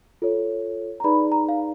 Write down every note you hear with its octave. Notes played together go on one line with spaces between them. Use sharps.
F4 A4 C#5
A#5
D#4 G#4 B4 D5 B5
A#5
F5